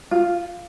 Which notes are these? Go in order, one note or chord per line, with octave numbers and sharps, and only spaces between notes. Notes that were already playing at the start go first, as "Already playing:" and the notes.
F4